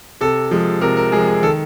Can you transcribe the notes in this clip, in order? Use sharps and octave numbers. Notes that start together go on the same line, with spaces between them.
C3 A4
F3 G#3
C3 A#4
A#4
F3 G#3 G#4
G#4
D#3 A4